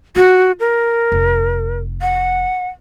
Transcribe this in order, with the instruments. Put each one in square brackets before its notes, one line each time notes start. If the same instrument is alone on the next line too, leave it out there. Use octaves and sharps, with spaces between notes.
[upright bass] F4 [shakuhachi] F#4
[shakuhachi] A#4
[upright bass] F1
[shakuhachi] F#5